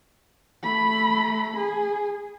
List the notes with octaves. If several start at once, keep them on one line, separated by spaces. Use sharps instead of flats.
A3 B5
G#4